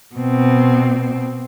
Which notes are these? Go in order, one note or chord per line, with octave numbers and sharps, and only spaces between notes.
B2 C4